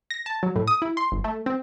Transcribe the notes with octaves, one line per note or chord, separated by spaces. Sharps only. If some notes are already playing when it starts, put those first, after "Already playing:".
A#6
A5
F#3
A2
D#6
E4
C6
G1
A3
C4